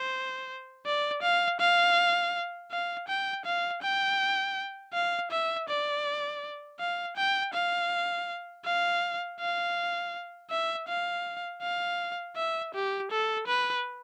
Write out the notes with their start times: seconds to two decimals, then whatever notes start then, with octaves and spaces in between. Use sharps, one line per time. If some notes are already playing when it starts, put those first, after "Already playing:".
Already playing: C5
0.86 D5
1.22 F5
1.60 F5
2.71 F5
3.08 G5
3.45 F5
3.82 G5
4.94 F5
5.31 E5
5.69 D5
6.80 F5
7.17 G5
7.54 F5
8.65 F5
9.40 F5
10.50 E5
10.88 F5
11.62 F5
12.36 E5
12.74 G4
13.11 A4
13.47 B4